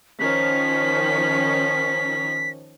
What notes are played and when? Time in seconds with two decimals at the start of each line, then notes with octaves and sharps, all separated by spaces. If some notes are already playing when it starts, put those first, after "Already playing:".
0.20 D#3 F3 C#4 B6